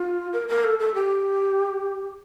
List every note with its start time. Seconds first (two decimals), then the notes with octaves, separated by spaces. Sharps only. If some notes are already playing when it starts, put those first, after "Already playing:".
Already playing: F4
0.33 A#4
0.48 A#4
0.64 A4
0.79 A4
0.94 G4